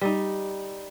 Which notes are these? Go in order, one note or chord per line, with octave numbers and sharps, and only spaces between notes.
G3 D#4